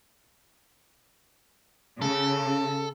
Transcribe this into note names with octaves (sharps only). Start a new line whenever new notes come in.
C#3 A4